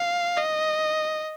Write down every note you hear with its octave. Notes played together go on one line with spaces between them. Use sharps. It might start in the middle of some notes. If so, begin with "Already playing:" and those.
Already playing: F5
D#5